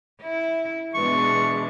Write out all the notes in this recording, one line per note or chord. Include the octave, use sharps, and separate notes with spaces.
E4
B2 E3 G#3 D4 C#6